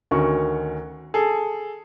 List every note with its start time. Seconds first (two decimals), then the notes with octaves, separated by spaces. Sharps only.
0.11 D2 D#3 C#4 F#4 C#6
1.14 G#4 A4